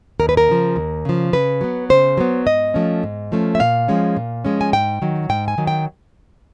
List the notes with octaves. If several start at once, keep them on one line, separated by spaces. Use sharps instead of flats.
D#2 A#4
B4
A#4
C#3 F3
D#2
C#3 F3
C#3 B4
F#3 B3
C#3 C5
F#3 B3
G#2 D#5
F3 A3 C#4
G#2
F3 A3 C#4
E5
A#2 F5
F3 G#3 C#4
A#2
F3 G#3 C#4
G#5
G#2 G5
D#3 F#3
G#2 G5
G#5
D#3 F#3
G5